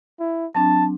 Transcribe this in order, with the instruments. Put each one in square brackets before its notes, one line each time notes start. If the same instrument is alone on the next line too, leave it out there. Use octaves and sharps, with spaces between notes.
[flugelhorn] E4
[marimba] F#3 C4 D4 [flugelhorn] A5